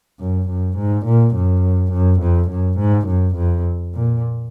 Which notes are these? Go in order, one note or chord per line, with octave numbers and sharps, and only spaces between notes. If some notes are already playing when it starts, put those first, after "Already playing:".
F#2
F#2
G#2
A#2
F#2
F#2
F2
F#2
G#2
F#2
F2
A#2